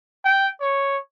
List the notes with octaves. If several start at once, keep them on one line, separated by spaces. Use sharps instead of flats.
G5
C#5